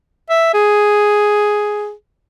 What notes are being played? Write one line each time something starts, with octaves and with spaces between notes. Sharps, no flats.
E5
G#4